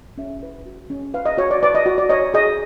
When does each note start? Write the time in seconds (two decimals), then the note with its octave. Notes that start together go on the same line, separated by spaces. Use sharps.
0.18 C#4 E5
0.43 B4
0.66 F#4
0.90 C#4
1.14 B4 F5
1.26 D#5
1.38 F#4 C#5
1.51 D5
1.63 B4 D5
1.75 D#5
1.86 F#4
1.98 D5
2.10 C#5 D#5
2.34 G#4 D#5